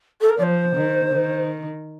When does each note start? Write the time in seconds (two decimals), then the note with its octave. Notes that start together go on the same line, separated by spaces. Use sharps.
0.21 A4
0.30 A#4
0.38 F3 D5
0.43 C5
0.75 D#3
1.13 D#3